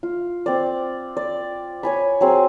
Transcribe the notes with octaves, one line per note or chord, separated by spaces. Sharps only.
F4
C4 D5
D5
C#5 G#5 B5
F#3 C4 G#4